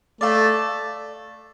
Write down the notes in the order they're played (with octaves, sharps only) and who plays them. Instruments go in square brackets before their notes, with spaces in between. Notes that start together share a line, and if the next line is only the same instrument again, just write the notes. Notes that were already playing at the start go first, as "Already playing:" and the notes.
[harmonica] A3 [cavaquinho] D5 F5 A5